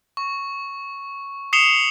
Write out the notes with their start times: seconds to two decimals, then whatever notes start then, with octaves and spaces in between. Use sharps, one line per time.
0.17 C#6
1.53 D#6 C7 C#7 E7 F7 G7